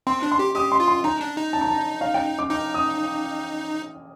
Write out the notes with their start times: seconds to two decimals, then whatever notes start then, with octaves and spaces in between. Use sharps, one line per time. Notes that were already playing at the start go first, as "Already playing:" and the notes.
0.07 C4 C6
0.23 D4
0.32 C6
0.39 G4
0.55 G4 D#6
0.72 C6
0.80 F4
0.88 C6
1.04 D#4 A#5
1.21 D4
1.37 D#4
1.53 A5
1.61 A#5
1.68 A5
2.01 F5
2.14 G5
2.39 D6
2.50 D#4 D6
2.74 D#6